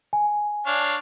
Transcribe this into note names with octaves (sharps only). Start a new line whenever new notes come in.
G#5
D4 C#5 F5